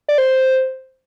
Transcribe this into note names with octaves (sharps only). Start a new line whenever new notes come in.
D5
C5